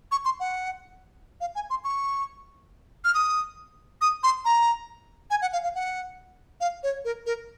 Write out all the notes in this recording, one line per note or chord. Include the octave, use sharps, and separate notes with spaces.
C#6
C6
F#5
F5
G#5
C6
C#6
F6
D#6
D#6
C6
A#5
G#5
F#5
F5
F5
F#5
F5
C#5
A#4
A#4